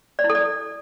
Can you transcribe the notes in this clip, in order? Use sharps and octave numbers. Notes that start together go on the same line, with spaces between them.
D5
E4
A4
D5